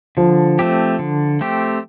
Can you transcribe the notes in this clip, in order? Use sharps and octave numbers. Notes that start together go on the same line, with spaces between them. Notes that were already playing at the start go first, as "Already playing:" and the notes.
D3 F3
A3 C4 G4
D3
A3 C4 G4